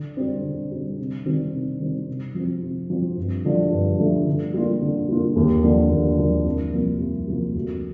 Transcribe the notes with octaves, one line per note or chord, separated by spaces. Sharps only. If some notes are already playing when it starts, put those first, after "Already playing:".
Already playing: D3
G3 C4
D3
G3 C4
C3
D#3 G3 C4
C3
D#3 G3 C4
C3
F3 C4
C3
F3 C4
G2
D3 F3 A3 D4
G2
D3 F3 A3 D4
D3
G3 A#3 F4
D3
G3 A#3 F4
D#2
D3 F3 A#3 D4
D#2
D3 F3 A#3 D4
C2
C3 F3 A#3
C2
C3 F3 A#3
D2